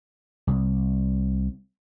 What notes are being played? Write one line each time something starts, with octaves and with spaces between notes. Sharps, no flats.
C2